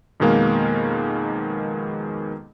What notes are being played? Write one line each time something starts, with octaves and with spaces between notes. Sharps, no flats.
F2 B2 D#3 G#3 A#3 F5